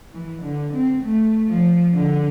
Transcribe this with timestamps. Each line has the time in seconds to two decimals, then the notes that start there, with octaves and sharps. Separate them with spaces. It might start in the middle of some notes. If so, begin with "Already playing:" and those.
0.13 E3
0.42 D3
0.73 C4
1.03 A3
1.49 F3
1.94 D3